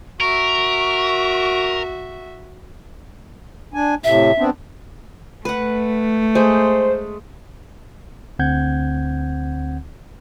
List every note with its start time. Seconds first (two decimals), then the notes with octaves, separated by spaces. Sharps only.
0.20 F#4 A#4 E5 C#6
3.74 D4 G#5
4.04 A2 C3 E5
4.38 B3 C4 D4
5.45 A3 B4 F#5
6.35 G#3 C5
8.39 D2 D3 C4 F#5 G6 G#6